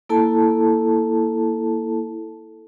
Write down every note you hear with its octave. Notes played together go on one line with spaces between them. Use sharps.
A#3 E4 A4 A5